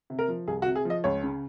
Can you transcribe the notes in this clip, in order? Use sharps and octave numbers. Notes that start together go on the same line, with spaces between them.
C3
A#4
F3
C2 G#4
F#4
C3
G#4
F3 D#5
C#2 C#5
C#3